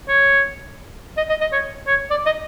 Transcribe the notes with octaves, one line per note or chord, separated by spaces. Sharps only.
C#5
D#5
D#5
D#5
C#5
C#5
D5
D#5